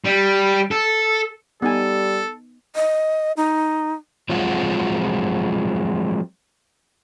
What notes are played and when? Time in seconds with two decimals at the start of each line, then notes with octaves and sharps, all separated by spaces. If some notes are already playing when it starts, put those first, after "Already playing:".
0.05 G3
0.71 A4
1.62 G3 B3 D#4 A4 G#5
2.76 D#5
3.37 D#4
4.29 F3 F#3 G#3 C4 F4 F#4